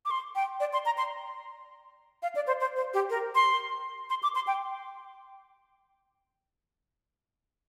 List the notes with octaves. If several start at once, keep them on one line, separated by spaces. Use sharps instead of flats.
D6
C6
G5
D5
C6
A#5
C6
F5
D5
C5
C5
C5
G4
A#4
C6
C6
D6
C6
G5